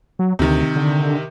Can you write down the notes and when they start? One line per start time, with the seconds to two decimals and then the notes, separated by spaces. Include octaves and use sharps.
0.19 F#3
0.39 D2 C3 D#3
0.76 D3